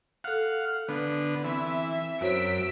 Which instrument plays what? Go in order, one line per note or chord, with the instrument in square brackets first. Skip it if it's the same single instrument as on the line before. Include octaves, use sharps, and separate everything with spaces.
[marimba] A4 F#6 [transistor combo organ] F5 F#5
[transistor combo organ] D3 B3
[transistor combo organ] E3 [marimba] C4 B5 [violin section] E5
[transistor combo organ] F#2 [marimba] F#4 C5 C#5 [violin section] E6 B6 D7